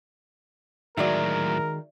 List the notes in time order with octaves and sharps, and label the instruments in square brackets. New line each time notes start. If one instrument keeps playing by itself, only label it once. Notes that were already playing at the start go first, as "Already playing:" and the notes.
[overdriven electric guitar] A2 F#3 [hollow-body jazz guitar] D#3 G#3 F#4 [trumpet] A#4 [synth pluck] D5 E5